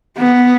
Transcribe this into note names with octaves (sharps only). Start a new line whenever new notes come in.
B3